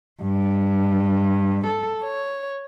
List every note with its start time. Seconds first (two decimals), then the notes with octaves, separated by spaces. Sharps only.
0.22 G2
1.66 A4
2.02 C#5